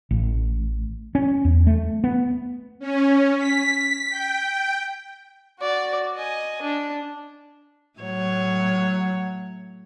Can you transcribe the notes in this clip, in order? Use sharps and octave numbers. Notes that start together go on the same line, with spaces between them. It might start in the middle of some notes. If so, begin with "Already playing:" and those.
A1
C#4
E2
A3
B3
C#4
B6
G5
F#4 D5
D#5 G#5
D4
A2 F#3 C#5